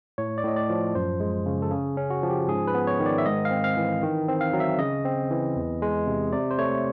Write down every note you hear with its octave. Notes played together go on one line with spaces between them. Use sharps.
A2 C#5
D5
A2 D#5
D5
F3
F#2 C5
G#3
C#3
A4
C#3 G#4
C#4
F#4
F3
G4
G#2 G#4
B4
B3
C#5
D#3
D5
E5
G#2 D#5
F5
C4
F5
E3
D#3
C4
F5
F#3
E5
C#3 D#5
C4
E3
E2
G#3
C3
C3 D5
C5
A3 C#5